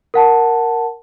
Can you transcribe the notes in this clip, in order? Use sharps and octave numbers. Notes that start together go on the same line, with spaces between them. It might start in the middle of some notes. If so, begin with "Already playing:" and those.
A#4 F#5 A5